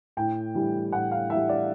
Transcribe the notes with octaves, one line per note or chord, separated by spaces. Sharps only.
A2 G5
E3 G3
A2 F#5
F5
E3 G3 E5
D5